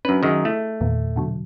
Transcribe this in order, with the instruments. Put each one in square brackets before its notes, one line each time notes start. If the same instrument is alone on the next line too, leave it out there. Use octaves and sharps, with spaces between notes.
[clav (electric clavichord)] F#2 B4 [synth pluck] C#4 D4
[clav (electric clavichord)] F#2 D#3 [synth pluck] G#4 D#5
[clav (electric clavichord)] A3 [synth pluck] E4
[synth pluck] E2 A#2 D#3
B2 D3 F#3